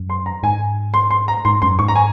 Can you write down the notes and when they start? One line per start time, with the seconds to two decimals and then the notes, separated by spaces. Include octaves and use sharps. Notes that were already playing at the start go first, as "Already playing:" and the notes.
Already playing: F#2
0.10 C6
0.26 A#5
0.43 G#2 G#5
0.94 C6
1.11 C6
1.28 A#5
1.45 G#2 C6
1.62 F#2 C6
1.79 G#2 C#6
1.88 A#5
1.96 G#5